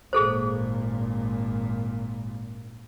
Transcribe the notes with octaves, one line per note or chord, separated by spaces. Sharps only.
G#1 A#2 G#4 A4 C5